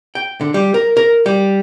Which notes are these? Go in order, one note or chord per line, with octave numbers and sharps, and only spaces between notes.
G5
D3
G3
A#4
A#4
G3